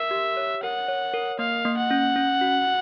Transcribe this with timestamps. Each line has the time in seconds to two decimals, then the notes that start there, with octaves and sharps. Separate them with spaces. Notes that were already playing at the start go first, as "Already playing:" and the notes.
Already playing: A#4 E5
0.11 G4
0.37 C#5
0.63 A#4 F#5
0.88 C#5
1.14 A#4
1.39 A#3 F5
1.65 A#3
1.77 F#5
1.91 C#4
2.16 C#4
2.41 F#4